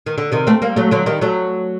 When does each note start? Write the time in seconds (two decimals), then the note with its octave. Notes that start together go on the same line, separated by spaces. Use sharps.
0.06 D#3
0.18 D3
0.32 C3 D#3
0.47 A3 C4
0.62 G3 A#3
0.76 F#3 A3
0.91 D3 F#3
1.06 D#3 G3
1.21 F#3 A3